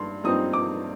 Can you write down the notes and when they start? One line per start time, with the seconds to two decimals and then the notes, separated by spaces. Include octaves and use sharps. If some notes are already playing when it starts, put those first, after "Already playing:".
Already playing: G2 C6
0.24 G2 F3 C4 D#4 D#6
0.53 D6